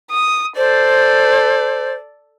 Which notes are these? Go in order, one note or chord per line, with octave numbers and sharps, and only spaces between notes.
D#6
A4 C5 D5